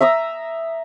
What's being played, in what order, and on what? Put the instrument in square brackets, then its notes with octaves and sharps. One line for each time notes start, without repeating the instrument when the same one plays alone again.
[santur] E5 A#5 D#6 E6